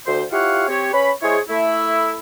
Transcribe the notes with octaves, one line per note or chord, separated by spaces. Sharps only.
D2 C5
E4 F4 G4 C#5 F5 F#5
C4 G4 C#5
C#4 B4 C#5 B5
G#3 E4 G#4 C5 C#5
A3 E4